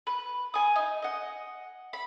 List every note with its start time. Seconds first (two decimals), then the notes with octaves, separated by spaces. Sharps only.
0.07 B4
0.54 G#5 D#6
0.76 D#4
1.02 D#5 F#5
1.93 B5